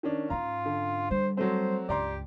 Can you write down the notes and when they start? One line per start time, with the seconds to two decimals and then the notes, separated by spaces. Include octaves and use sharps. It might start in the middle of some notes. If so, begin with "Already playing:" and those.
0.03 D#3 C#4 D4
0.30 G#2 C#4 F4 A#5
0.66 D3
1.11 G3 C5
1.37 F#3 A3 C4 C5
1.89 C#2 G2 G4 D5 A#5 C6